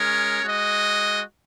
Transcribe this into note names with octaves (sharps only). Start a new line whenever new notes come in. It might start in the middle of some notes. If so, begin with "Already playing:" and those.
Already playing: G#3 C#4 A#4 C#5
G#3 F#4 D#5